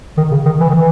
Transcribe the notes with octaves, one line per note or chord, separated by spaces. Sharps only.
D#3
C#3
D#3
E3
D#3
E3